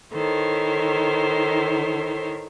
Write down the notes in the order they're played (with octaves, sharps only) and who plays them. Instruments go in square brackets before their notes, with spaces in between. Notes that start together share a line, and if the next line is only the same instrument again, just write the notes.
[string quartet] D#3 E4 A4 C5 C#5